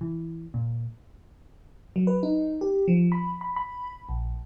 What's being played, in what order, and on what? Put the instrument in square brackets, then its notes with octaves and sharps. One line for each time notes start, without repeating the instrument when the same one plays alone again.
[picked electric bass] E3
A#2
[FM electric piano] F#3
B4
D#4
G4
F3
B5
B5
B5
A#1